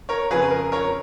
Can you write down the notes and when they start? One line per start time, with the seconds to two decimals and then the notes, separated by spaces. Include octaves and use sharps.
0.09 A#4 C#5
0.31 F2 C#3 F3 G#4 B4
0.42 B4
0.51 A#4
0.72 A#4 C#5